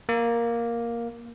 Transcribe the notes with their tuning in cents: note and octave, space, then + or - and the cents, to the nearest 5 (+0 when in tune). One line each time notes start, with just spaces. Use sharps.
A#3 +5